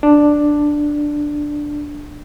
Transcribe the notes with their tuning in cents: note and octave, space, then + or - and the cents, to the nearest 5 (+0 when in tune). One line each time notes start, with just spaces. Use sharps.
D4 +5